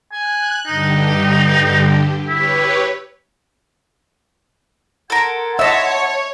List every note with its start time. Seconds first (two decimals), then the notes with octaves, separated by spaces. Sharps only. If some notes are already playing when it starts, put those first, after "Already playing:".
0.13 G#5 F#6
0.67 G2 D3 D#4 G4
2.28 E4 G4 B4 C#5
5.10 A4 A#4 F#5 C6 G#6
5.59 C#5 D#5 E5 A5 E6